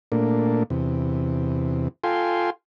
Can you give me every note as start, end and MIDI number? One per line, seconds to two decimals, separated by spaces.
0.12 0.63 46
0.12 0.63 57
0.12 0.63 58
0.12 0.63 62
0.70 1.88 40
0.70 1.88 48
2.04 2.50 65
2.04 2.50 69
2.04 2.50 77
2.04 2.50 79
2.04 2.50 80
2.04 2.50 84